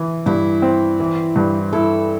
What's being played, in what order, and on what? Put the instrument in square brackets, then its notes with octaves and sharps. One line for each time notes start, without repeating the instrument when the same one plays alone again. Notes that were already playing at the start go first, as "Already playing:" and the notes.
Already playing: [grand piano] E3
[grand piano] G2 [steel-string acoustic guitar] E4
[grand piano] C4
E3
G2
[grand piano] E4 [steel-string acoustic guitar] A4